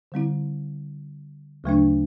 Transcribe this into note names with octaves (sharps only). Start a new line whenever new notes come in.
D3 G3 C4 E4
D2 C#3 F#3 A3 D4